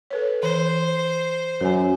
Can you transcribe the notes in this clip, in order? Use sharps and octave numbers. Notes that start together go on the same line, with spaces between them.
A4 B4 C#5
E3 C5
F#2 A#4 G#5